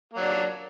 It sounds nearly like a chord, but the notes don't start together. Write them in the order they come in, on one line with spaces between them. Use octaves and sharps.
A#3 F#3 D4